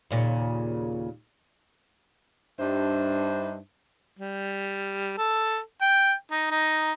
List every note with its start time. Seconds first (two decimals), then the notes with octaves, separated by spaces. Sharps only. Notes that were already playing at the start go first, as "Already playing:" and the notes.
0.11 D#2 A#2 C#3
2.59 G2 G3 D4 D#4 C5 E5
4.19 G3
5.18 A4
5.82 G5
6.31 D#4
6.51 D#4